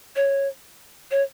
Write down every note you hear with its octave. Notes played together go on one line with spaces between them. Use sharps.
C#5
C#5